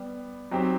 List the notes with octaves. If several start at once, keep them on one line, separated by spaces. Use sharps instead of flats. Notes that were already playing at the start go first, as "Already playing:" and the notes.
Already playing: G3 B3
F#3 C4 D#4 G4